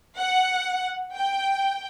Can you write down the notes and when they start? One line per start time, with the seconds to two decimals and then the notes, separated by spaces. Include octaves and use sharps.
0.18 F#5
1.16 G5